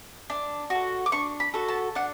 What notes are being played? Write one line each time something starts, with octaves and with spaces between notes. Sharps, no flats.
D4
F#4
A4
D6
D4 C#6
B5
F#4 A4
A5
D4 F#5